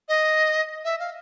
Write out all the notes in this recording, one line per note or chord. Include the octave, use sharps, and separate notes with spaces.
D#5
E5
F5